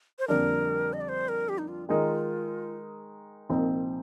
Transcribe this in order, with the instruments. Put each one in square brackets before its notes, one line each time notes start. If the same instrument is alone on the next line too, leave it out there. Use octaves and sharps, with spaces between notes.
[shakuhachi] C5
[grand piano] F2 D3 G3 A#3 D4 [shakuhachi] A#4
[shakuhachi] D#5
D5
C5
A#4
G4
D#4
F4
[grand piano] D#3 G#3 D#4 A#4 [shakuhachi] F4
[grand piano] C2 A#2 F3 C4 D#4